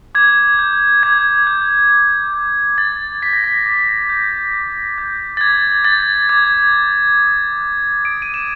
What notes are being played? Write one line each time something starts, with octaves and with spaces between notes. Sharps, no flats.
D6 G#6
G6
D6 G#6
G6
D6
G6
D6 A6
G6 B6
A#6
B6
D6
G6
D6
G6
A6
D6 G#6
G6 A6
D6 G#6
G6
D#6
F#6
D#6 D7
D#7
E7